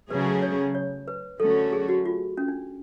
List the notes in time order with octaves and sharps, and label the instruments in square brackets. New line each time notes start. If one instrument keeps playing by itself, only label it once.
[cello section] C#3 F#3 A3 C#4 G#4 [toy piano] B4
[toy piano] C#5
C#5
B4
[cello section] D3 F#3 A3 C#4 F#4 [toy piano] A4
[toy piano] G#4
F#4
F4
C#4
D4